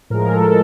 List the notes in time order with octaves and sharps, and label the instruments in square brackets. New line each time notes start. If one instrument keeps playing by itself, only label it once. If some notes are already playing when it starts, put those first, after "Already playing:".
[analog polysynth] A2 F3 G#3 A#4
A4